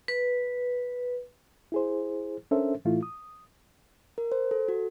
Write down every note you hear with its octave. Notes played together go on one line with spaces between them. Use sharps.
B4
E4 G#4 C5
C#4 D4 A4 A#4 C5 E5
A2 E3 A3 E4 F4
D#6
A#4
C5
A4
F#4